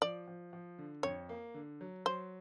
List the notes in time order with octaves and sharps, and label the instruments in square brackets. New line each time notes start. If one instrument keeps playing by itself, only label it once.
[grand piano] F3 [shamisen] D5
[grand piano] F3
F3
D3
[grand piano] F2 [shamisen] C#5
[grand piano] A#3
D3
F#3
[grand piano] F#3 [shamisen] C5